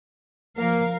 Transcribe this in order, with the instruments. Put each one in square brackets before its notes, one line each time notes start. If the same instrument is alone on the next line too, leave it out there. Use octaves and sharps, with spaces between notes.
[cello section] F3 A#4 F5 [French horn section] A#3